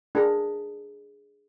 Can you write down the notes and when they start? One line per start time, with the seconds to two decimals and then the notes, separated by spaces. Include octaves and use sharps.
0.15 D4 G#4 A#4 A#5